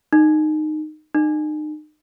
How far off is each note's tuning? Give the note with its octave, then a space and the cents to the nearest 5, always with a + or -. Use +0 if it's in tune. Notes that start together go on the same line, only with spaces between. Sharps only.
D#4 -15
D#4 -35